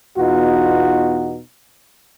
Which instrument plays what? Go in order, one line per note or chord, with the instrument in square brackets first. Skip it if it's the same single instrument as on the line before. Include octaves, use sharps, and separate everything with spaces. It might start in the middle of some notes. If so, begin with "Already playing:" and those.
[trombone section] E2 B2 D#4 F4 F#4